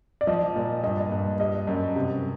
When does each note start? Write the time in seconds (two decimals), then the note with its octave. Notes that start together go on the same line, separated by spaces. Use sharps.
0.21 D5
0.27 F3 D#5
0.56 A#2
0.84 G2 D#5
1.12 G2
1.40 G3 D#5
1.67 F#2
1.96 C3